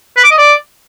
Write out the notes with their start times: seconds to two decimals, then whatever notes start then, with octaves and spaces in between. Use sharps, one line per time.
0.17 B4
0.24 D6
0.31 D#5
0.38 D5